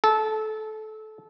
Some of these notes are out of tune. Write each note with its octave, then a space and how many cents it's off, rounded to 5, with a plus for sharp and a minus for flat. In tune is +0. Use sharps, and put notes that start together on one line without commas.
A4 -20